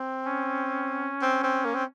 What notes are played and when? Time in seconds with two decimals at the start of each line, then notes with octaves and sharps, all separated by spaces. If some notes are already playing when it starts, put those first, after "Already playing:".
Already playing: C4
0.25 C#4
1.22 C4
1.44 C4
1.65 A#3
1.75 C4